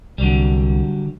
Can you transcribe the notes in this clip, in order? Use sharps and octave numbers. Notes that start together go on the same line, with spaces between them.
C2 D3 F#3 G3